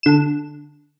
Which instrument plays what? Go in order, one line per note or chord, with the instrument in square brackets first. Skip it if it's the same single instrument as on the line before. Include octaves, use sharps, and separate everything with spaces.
[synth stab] D3 E7